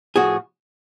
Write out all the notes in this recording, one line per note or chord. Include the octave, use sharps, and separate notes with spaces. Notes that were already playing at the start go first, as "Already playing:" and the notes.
A2 F3 F#4 G#4